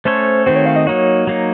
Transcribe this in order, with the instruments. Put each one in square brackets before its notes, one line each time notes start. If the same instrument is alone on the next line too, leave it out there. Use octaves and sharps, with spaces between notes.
[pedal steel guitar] A3 C#4 A4 C#5 [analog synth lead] C5
[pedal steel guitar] D#3 A3 C4 F#4 [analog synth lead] C5
[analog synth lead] C#5
F5
D#5
[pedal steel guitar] F#3 A#3 D#4 F#4 [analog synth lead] C#5
[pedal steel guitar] F#3 A#3 D#4